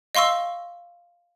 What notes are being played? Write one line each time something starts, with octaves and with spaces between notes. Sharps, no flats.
D#5 F5 C6 C#6 E6